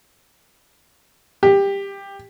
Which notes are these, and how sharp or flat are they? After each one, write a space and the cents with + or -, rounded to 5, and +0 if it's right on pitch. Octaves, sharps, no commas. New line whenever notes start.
G4 +15